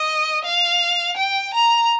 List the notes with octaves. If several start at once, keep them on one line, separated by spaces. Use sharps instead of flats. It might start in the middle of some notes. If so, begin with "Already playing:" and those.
Already playing: D#5
F5
G5
A#5